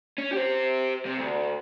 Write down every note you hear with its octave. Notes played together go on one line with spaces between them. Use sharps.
C#4
G4 C5
C3
D2